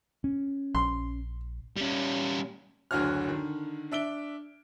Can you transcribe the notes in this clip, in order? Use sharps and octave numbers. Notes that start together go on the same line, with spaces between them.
C#4
A#1 C6
G3 C#4
F#1 D2 D3 F#4 C#5 F6
D3 D#3
D4 E5 D7 G7